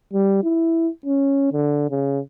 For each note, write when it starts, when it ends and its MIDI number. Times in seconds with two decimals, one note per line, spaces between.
0.14 0.43 55
0.44 0.88 64
1.06 1.51 61
1.52 1.89 50
1.90 2.19 49